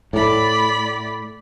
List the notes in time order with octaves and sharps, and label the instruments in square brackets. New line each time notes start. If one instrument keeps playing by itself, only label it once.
[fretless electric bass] A2 [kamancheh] D5 B5